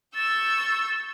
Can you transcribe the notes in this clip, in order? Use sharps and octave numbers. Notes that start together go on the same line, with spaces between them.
C#6 E6 G6 A6